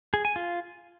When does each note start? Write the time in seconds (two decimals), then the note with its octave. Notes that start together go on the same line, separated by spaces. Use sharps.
0.14 G#4
0.25 G#5
0.36 F4